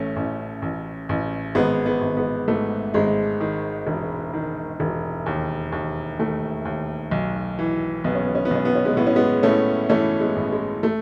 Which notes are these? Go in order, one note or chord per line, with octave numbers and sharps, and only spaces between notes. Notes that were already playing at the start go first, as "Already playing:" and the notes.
Already playing: A1 A3 C#4
A1
A1
A1
G#1 G#3 B3
G#3 B3
G#1
G#3 B3
G#2 A3
G#1 G#3
D#3
E1
D#3
E1
D#2
D#2
D#2 A3
D#2
B1
E3
B1 B3
C#4
B3
C#4
B3
B1 C#4
B3
C#4
G#3 B3
A2 B3
C#4
G#3 B3
A2 A3 C#4
E3 A3 C#4
G#3 B3
A1
G#3
A3